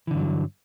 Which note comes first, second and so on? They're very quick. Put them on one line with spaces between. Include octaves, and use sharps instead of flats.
E3 D3 G2 F#3